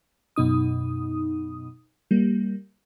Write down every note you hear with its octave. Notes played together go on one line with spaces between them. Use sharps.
F#2 B2 D#4 D#6
G3 A#3